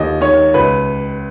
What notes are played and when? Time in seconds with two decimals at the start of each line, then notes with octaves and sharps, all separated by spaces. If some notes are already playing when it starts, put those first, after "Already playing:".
Already playing: D#2 D#3 D#5
0.21 D#3 C#5
0.54 C#2 B4